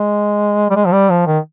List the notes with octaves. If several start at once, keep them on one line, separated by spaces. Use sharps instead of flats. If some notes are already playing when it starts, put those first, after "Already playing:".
Already playing: G#3
G3
G#3
F3
G3
F3
D#3